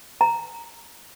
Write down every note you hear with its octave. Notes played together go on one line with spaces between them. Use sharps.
A#5